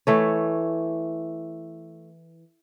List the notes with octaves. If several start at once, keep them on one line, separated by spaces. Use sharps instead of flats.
E3 A3 C#5